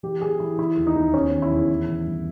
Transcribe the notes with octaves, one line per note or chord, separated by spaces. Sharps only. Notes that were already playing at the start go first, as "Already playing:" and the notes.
E3 G4
E3 G#4
E3 E4
E3 E4
D#2
D#4
D#2
E2 C#4
D#3
E4
E2
E3
E3
G2